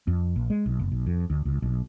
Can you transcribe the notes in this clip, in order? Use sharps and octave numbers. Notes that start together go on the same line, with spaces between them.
F2
A#1
G#3
B1
F#1
B1
F2
D2
C#2
B1